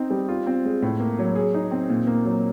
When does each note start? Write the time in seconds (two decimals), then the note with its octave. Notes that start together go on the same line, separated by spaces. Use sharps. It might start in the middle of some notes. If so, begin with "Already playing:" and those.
Already playing: C4 D#4
0.10 G3
0.29 F4
0.47 C4
0.65 G#3
0.82 A2
1.00 A#3
1.19 F#3
1.35 G#4
1.54 D#4
1.71 C4
1.89 A#2
2.07 A#3
2.25 F#3